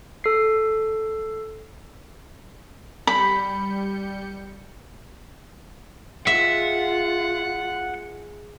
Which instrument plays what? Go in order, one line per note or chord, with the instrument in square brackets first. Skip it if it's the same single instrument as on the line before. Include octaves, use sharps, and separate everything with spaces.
[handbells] A4 C7
[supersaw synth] G3 G6 C#7 [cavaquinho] B5
[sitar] G#3 [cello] F4 [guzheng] E5 [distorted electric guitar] F#5